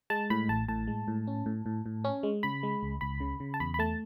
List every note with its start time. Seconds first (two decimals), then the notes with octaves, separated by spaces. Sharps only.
0.10 G#3 A5
0.30 A2 B5
0.49 A1 A5
0.68 A2 A5
0.87 G#3
1.08 A2
1.27 C#4
1.46 A2
1.66 A2
1.86 A2
2.04 C#4
2.23 G#3
2.43 C#3 B5
2.63 G#3
2.83 C#2
3.01 C#2 B5
3.20 C#3
3.40 C#3
3.54 A5
3.60 E2 B5
3.74 B5
3.79 A3 A5